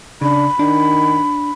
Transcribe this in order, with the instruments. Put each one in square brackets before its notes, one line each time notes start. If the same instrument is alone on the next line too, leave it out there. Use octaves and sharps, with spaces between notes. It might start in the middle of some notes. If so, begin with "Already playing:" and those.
[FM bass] C#3 [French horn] D4 [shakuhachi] B5
[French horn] D#3 [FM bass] D4